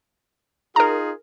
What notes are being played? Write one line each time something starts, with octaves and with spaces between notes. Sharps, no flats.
D#4 F4 G#4 A#4 A#5